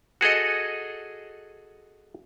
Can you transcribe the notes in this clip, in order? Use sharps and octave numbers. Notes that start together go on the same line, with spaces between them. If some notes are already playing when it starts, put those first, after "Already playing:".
F#4 G#4 A4 D#5